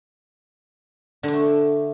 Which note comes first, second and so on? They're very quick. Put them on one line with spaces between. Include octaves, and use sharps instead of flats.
D3 D4 A3